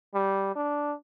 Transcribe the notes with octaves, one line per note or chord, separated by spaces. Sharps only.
G3
D4